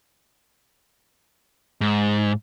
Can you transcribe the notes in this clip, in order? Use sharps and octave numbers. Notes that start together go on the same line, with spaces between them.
G#2